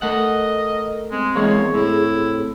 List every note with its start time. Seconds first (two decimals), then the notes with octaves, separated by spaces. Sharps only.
0.02 A3 A#4 D#5 F#5
1.11 G#3 C4
1.35 E2 G#3 A#3 G#4 C#5
1.74 A2 E4